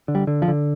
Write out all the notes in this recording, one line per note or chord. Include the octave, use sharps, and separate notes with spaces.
D3
G3
D3
F3
D3